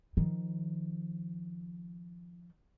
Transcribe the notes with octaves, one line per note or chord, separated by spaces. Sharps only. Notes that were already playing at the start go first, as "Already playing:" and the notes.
D#3 F3